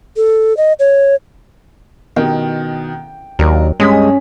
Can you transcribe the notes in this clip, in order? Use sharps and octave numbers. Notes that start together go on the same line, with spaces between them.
A4
D#5
C#5
B2 D#3 G5
D#2 F#3 D4 A#4
G2 G#3 C#4 D#6 B6